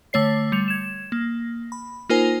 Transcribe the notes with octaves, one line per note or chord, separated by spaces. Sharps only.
D3 A3 C#5 C7
G3 C#7 F7
G#6 E7
A#3
B5
A#3 D#4 F4 A#4 C5 G#5